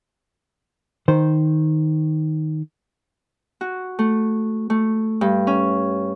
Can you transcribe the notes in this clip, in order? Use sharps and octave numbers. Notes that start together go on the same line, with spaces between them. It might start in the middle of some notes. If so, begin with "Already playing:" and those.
D#3 C5
F#4
A3
A3
G2
C#4